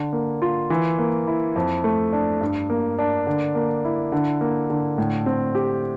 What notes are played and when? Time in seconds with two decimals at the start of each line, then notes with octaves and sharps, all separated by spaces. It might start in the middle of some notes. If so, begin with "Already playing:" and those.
Already playing: D3
0.13 A#3
0.42 F4
0.70 E3
0.99 A#3
1.27 E4
1.56 F2
1.84 A3
2.13 D4
2.41 G2
2.70 A#3
2.99 D4
3.27 D3
3.55 A#3
3.84 E4
4.12 D3
4.41 A#3
4.70 D3
4.98 A2
5.26 C4
5.55 G4